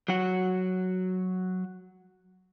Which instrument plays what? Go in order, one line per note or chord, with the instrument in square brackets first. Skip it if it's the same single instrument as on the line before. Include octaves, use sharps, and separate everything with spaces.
[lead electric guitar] F#3 F#4